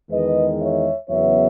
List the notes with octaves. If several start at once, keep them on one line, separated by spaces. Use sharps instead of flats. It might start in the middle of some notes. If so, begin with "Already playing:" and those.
E2 D#3 G#3 B4 D#5
C#5 E5
E2 C#3 F#3 B3 C#5 E5